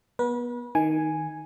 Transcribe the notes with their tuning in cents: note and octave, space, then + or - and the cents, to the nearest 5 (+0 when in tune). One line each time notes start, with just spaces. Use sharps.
B3 -25 B4 -35
D#3 +5 G#5 +0